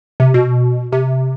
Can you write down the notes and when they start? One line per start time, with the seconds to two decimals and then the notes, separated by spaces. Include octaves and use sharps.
0.20 C3
0.34 B2
0.92 C3